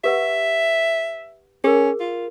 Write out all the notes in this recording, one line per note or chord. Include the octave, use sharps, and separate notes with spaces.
G4 B4 E5 F#5
C#4 G#4 A#4
F4